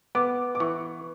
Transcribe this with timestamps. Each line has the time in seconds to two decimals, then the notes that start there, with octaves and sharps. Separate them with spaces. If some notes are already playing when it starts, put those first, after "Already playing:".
0.15 B3 D6
0.55 D6
0.60 E3 C#6